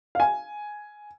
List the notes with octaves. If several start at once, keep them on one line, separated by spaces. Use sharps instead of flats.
F5
G#5